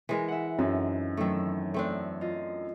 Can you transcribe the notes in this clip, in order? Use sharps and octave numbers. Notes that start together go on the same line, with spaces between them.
E3 G#3 A#4
E5 F#5
F#2 C4 D#4 A4
E2 D#3 F#3 A3 E6
A3 C4 D4
F4 D#5